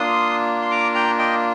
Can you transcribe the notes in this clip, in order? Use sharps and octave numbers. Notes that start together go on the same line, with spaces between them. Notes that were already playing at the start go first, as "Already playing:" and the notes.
Already playing: A#3 D4 F4 C6 D#6
C6
A#5 D6
G5 A#5
D#5 G5